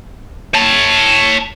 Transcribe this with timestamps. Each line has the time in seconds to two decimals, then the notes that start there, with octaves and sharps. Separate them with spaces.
0.54 C#5 A5